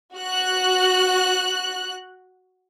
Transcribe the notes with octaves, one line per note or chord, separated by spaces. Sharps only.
F#4 F#6